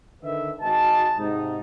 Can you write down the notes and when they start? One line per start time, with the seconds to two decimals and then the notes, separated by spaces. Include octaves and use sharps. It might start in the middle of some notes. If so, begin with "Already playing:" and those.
0.24 D3 D#3 B4 E5
0.61 G#1 F#4 D#5 G#5 A5
1.19 G#2 C3 D#4